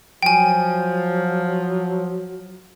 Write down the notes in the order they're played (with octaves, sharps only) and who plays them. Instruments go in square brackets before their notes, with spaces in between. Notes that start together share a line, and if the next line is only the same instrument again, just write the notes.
[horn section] F3 [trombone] F#3 [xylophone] G5 G#5